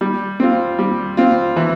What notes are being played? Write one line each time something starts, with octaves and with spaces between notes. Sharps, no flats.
G3
C4 F4
G3
C4 F4
E3